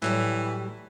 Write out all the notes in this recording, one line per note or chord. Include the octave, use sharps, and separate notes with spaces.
A2 E3 F#3 G3